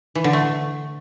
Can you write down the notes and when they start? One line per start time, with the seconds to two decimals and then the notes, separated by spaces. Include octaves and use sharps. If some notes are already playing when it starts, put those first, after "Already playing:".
0.15 E3
0.24 D3
0.33 A3